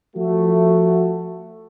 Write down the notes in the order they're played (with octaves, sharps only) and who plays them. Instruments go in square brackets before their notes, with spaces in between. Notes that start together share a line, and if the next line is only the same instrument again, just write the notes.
[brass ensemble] F3 A3 F#4